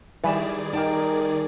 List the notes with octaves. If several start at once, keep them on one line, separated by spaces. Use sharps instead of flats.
D#3 E3 G3 G#4 B4 D5 E7
D#4 A#4 G5 A5